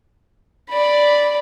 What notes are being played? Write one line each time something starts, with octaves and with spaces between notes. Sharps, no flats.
D5 B5